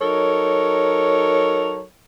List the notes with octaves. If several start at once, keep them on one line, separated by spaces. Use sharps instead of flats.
F#3 D#4 A4 A#4 C#5